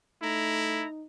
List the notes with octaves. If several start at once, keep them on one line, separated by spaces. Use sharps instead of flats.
A3 D#4 E4 A#5